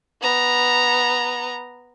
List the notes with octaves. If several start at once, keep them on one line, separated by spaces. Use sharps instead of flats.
B3 A#5